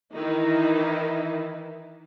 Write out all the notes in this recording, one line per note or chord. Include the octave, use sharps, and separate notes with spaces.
D#3 E3 D#4 E4